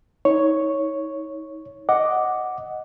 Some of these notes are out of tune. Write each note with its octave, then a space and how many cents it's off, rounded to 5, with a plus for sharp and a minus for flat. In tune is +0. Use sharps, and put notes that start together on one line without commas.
D#4 +35 C#5 +0
D#5 +0 F#5 +0 D6 +0